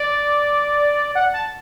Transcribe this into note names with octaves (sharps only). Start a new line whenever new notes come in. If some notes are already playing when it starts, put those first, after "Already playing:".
Already playing: D5
F#5
A5